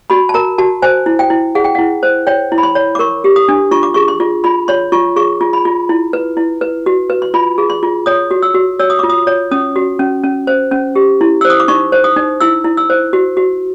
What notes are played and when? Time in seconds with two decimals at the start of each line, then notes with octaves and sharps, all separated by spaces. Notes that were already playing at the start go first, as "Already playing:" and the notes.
0.10 F#4 B5
0.29 A5
0.34 A#4 A#5
0.58 F#4 A5
0.82 C5 G#5
1.06 E4
1.19 G5
1.30 E4
1.55 G#4 F#5
1.64 G5
1.75 E4 F#5
2.03 C5
2.27 C#5 G5
2.52 E4
2.58 B5
2.63 C6
2.75 C#5
2.95 D6
2.99 A#4 C#6
3.24 G4
3.36 D#6
3.48 D4
3.71 F4 C#6
3.83 D6
3.94 G#4 C#6
4.08 C6
4.20 F4
4.44 F4 B5
4.68 C#5 C6
4.92 F4 C#6
5.16 G#4 C#6
5.41 F4
5.53 B5
5.65 F4
5.89 E4
6.13 B4
6.37 E4
6.61 B4
6.86 F#4
7.10 B4
7.22 C6
7.34 F4 B5
7.58 G#4
7.70 C6
7.83 F4
8.06 C#5 D#6
8.31 F#4
8.43 E6
8.54 F#4
8.79 C#5 E6
8.90 D#6
8.99 F4 D6
9.10 D#6
9.27 C#5
9.51 C#4 D#6
9.76 F#4
9.99 C#4
10.24 C#4
10.47 C5
10.71 C#4
10.95 G4
11.21 E4
11.41 C5 E6
11.50 D#6
11.60 D6
11.68 D#4 C#6
11.92 C5
12.04 D#6
12.16 D#4
12.41 E4 E6
12.64 E4
12.77 E6
12.90 C5
13.13 F#4
13.37 F#4